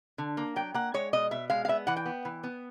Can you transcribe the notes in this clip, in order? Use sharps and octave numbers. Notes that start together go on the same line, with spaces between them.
D3
A#3
F#3 G5
A#3 F#5
G#3 C#5
B2 D#5
B2 E5
G#3 F5
F5
B3 E5
E3 F#5
G5
B3
E3
B3